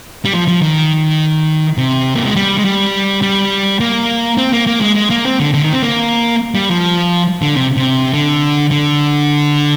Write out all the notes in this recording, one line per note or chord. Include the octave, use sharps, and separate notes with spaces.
G3
F3
F3
D#3
C3
A#3
G#3
G3
G#3
G3
G3
A#3
C4
A#3
A#3
G#3
G#3
A#3
C4
D3
D3
D#3
C4
A#3
G3
F3
D3
C3
C3
D3
D3